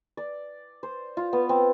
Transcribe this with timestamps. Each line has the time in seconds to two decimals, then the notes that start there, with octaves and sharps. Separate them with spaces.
0.17 D5
0.83 C5
1.17 F4
1.33 B3
1.49 C4